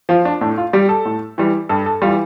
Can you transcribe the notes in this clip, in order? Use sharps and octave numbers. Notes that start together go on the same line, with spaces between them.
F3 F4
D4
A2 D4
F4
G3 G4
A4
A2
E3 G3
G2 A4
A4
G3 F4
E3